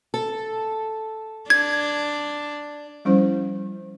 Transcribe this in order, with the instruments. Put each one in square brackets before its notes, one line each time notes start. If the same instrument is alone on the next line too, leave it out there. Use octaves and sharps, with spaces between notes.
[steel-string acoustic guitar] A4
[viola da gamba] D4 [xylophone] G#6
[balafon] F3 G3 C#4 E4 C5